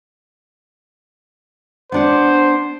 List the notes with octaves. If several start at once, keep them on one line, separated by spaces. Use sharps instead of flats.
B3 D4 C5 F#5